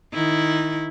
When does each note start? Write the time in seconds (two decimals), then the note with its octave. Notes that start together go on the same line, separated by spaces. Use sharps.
0.14 D#3 E4